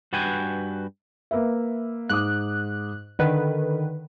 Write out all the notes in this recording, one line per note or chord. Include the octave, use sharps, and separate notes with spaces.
G2 F#4 B4 G5 G#5
A#3 B4 E5
G#2 D6 D#6 F#6
D3 D#3 B4 D#5